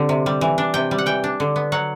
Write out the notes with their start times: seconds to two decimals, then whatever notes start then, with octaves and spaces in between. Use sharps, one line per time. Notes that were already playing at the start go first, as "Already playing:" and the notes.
Already playing: D3 G3 C4
0.09 C3
0.26 G3
0.41 E3
0.58 D4
0.74 C3 G5
0.91 G3
0.98 F#5
1.06 E3 G5
1.24 D4
1.40 D3
1.56 B3
1.72 F#3 F#5